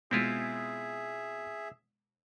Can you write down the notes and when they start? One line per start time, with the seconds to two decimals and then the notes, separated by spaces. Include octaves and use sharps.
0.11 B2 G#3 C4 E4 F4 G#4 E5